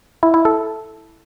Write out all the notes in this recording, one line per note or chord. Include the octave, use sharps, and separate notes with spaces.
E4
E4
A4